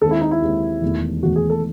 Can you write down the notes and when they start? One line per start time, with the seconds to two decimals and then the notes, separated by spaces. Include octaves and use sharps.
0.01 D#2 D#3 G#3 C4 A4
0.11 E4
0.21 D#4
0.31 E4
0.41 D#2 D#3 G#3 C4
0.82 E1 E2 D#3 A3
1.22 E1 E2 D#3 A3 F#4
1.36 G#4
1.50 A4